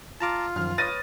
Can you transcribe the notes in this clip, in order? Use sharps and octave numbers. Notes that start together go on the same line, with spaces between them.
F4 A5 A#5 D6
F#2 D#3 F3 F6
B4 C#5 D#6 A6 A#6 D#7